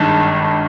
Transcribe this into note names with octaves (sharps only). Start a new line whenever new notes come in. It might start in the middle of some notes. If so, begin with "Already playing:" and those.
Already playing: G#1 G2 D#3 A5